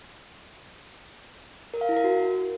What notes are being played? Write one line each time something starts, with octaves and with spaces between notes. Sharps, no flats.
A#4
F5
E4
A#4
F#4